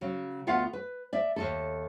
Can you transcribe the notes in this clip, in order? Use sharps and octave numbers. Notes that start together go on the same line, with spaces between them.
C#3 F#3
D2 B3 F4 F5 F#5
B4
D5 E5
D#2 G#2 A4